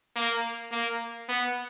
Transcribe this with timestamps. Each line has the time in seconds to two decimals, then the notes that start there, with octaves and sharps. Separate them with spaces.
0.16 A#3
0.72 A#3
1.28 B3